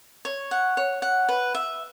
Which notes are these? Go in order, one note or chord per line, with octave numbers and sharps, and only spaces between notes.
C#5
F#5
C#5
F#5
B4
E5